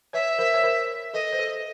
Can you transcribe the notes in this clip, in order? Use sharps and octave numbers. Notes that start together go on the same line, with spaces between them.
B4 C#5 E5
A#4 C5
C#5
A#4 C5
A4 B4 D#5
C5
A4 B4